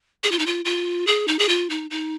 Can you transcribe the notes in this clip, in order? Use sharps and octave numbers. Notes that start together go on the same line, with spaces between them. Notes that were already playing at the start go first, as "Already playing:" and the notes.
G#4
F4
D#4
F4
F4
G#4
D#4
G#4
F4
D#4
D#4